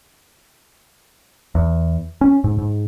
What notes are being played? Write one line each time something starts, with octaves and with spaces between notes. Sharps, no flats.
E2
C#4
G#2
G#2